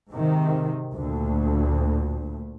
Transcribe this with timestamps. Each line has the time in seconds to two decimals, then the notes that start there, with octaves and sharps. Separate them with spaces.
0.11 G#2 C3 D#3
0.93 D2 A#2